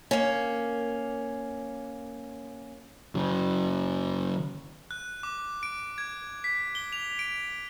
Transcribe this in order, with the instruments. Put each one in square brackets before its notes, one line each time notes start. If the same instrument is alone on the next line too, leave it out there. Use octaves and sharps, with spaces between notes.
[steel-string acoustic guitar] A#3 C#4
[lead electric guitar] C#3 F#3
[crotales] F#6
D6
D7
G#6
B6
G7
F7
D7